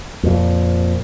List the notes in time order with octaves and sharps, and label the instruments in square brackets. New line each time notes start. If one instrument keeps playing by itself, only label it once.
[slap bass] F2 A#2